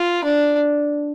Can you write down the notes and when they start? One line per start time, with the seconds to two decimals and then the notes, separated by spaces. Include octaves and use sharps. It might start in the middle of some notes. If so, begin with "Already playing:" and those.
Already playing: F4
0.25 D4